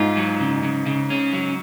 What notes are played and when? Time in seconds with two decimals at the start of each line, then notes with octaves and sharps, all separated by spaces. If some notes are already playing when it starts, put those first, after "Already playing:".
Already playing: G#2 F4
0.17 F#3
0.40 C#3
0.63 C#3
0.86 C#3
1.10 C#4
1.33 F#3